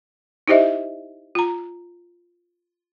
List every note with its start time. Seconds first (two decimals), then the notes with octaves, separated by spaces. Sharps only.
0.48 D#4 E4 G4 C5 D#5 E5
1.35 F4 A#5